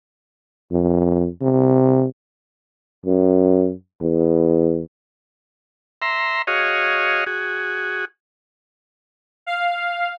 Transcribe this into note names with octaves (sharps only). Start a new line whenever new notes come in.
F2
C3
F#2
E2
E5 A#5 C6
F#4 G#4 C#5 D#5 F5
F#4 G#4
F5